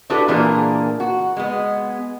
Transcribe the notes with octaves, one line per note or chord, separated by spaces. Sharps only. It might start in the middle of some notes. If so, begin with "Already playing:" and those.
D4 E4 F#4 G4 A4 B4
A#2 E3 A#3 D4 G#4 A#4
F#4
G#3 B3